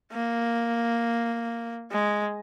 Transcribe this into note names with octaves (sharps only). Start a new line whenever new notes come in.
A#3
G#3